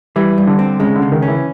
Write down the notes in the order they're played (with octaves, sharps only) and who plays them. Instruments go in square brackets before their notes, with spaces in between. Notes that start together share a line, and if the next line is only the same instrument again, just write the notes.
[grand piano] E3 [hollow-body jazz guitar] G3
[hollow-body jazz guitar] G2
[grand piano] D3
[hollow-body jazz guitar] C4
[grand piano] C#3 [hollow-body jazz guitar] G#3
[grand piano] D3
[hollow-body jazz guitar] C#3
[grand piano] D#3
[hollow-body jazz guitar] C#4
[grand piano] E3